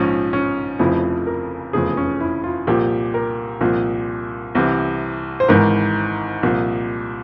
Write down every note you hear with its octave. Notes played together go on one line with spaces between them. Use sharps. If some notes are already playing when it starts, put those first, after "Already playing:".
Already playing: A#1 G#2 F3 C#4
C#4
F1 F2 C#3 F3 E4
A#4
F1 E2 C#3 F3 G#4
C#4
E4
F4
C2 A#2 F3 G4
A#4
C2 A#2 F3
C2 C3 E3
C5
G#1 G#2 E3 A#4
C2 A#2 F3